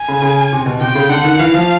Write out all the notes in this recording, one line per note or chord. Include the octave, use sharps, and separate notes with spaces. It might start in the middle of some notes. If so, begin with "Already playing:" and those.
Already playing: G#5
C#3
C#3
C3
B2
C3 G5
C#3
D3 F#5
D#3
E3 F5
F3